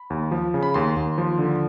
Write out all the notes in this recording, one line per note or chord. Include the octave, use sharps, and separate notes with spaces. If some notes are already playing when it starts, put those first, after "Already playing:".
Already playing: B5
D#2
F3
C#3
B5
D#2 C6
D#2
F3
D3